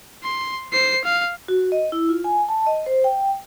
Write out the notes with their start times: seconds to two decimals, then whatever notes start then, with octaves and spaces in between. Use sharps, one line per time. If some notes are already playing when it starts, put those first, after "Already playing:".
0.24 C6
0.73 C5 C7
1.04 F5
1.48 F#4
1.72 D#5
1.92 E4
2.09 F4
2.24 G#5
2.49 A5
2.66 D#5
2.86 C5
3.04 G5